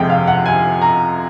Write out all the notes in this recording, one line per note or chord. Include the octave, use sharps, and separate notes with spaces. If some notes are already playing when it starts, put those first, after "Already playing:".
Already playing: F2 C3 F3 G#3 G5
F5
F#5
G#5
A#5